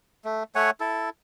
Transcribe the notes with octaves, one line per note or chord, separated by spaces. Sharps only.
A3
A3 C#5 F#5 G#5
E4 A4